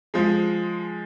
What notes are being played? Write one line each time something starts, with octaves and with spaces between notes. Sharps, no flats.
F3 G#3